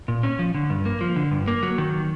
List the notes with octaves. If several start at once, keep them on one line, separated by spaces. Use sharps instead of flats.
A#2
C#4
F3
D3
G2
A#3
F3
D3
G2
A#3
F#3
D#3